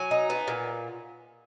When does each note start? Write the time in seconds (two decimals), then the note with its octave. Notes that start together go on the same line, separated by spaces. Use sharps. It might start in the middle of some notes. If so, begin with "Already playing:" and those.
Already playing: F#3 G#5
0.11 D#4
0.30 B3
0.48 A#2